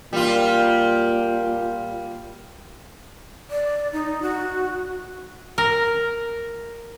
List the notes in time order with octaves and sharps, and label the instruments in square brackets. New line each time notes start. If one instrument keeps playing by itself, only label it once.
[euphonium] A#2 [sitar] G3 F4
[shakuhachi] D5
D#4
F#4
[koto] A#4